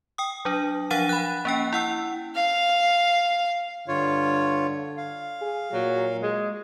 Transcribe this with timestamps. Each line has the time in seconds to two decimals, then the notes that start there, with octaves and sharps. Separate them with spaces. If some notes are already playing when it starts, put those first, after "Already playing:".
0.18 G5 D#6
0.45 F#3 D4
0.90 F3 D4 F5 F#5 A6 D#7
1.09 B5 F#6
1.45 A#3 C#4 G5
1.73 E4 F#5 E6
2.35 F5
3.88 G2 D3 F4 C#5
4.97 F5
5.41 G#4
5.73 A#2 F#3
6.23 G#3